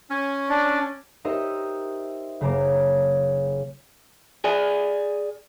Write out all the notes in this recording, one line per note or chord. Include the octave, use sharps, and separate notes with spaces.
C#4 G#5
D4 D5
D#4 G4 A#4 C5 D#5 E5
F#1 C#3 A#3 A#5 D6
G#4 D5 G#5